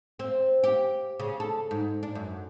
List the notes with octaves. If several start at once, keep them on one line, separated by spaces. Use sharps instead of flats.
C4
G4
C#3
A4
G#2
D4
F#2